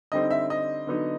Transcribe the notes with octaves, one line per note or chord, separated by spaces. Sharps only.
D3 G3 C4 D#4 D#5
E5
D#5
D3 F#3 B3 D#4